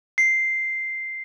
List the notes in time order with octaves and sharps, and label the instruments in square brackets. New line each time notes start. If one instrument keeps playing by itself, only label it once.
[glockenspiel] C7